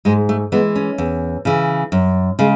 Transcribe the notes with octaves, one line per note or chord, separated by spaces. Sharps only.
G#2 G#3
A3
E3 G#3 B3
C#4
E2
C#3 E3
F#2
C#3 G#3